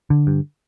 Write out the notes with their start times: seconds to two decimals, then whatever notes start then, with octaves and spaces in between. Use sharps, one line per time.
0.10 D3
0.27 G2